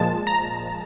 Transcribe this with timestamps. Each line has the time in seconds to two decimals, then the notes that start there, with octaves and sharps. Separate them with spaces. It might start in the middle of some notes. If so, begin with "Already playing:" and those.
Already playing: A#2 F3 G#3 A5
0.27 A#5